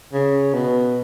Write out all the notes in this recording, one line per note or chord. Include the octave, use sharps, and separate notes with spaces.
C#3
B2